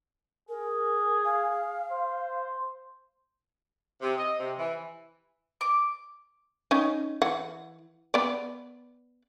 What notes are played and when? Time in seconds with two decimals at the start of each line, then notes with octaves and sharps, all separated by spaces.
0.49 G#4 A#4
1.25 F5
1.91 C5
4.01 C3
4.17 D#5
4.39 C3
4.58 E3
5.61 D6
6.71 C#4 D#4
7.22 E3 F#5
8.14 B3 D5